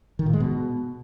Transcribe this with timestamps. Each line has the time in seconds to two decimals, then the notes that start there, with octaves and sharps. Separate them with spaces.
0.19 D#3
0.26 A#2
0.33 G#3
0.40 B2